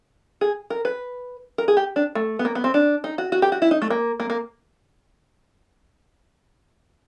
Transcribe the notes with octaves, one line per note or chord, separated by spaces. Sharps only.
G#4
A#4
B4
A#4
G#4
G4
D4
A3
B3
A#3
B3
C4
D4
D#4
F#4
F#4
G4
F#4
E4
D#4
A3
A#3
A#3
A#3